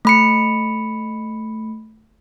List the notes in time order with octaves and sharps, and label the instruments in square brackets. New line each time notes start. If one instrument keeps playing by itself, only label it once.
[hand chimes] A3 B5 C#7